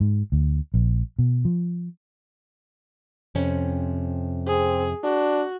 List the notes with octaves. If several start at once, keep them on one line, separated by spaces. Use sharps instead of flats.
G#2
D2
A#1
B2
F3
F2 C3 C#4
C4 G#4
D4 F#4